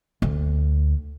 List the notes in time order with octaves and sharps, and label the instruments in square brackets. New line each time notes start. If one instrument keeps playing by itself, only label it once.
[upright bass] D2